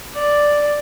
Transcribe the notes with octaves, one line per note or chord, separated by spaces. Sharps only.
D5